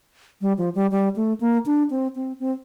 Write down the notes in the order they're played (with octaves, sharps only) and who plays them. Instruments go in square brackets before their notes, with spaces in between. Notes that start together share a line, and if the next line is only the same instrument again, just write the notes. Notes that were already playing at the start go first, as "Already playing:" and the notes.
[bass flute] G3
F3
G3
G3
A3
A#3
D4
C4
C4
C4